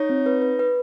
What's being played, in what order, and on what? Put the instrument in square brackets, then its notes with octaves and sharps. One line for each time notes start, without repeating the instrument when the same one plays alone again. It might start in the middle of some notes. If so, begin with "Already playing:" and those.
Already playing: [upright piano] D#4 [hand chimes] C#5
[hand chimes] C4
B4
B4
B4